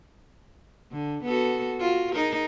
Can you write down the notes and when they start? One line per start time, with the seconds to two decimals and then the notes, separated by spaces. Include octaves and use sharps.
0.92 D3
1.24 B3 F#4 A4
1.80 F4 F#4
2.14 D#4 G#4 A#4